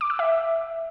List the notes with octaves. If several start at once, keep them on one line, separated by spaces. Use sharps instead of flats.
D6
E6
E5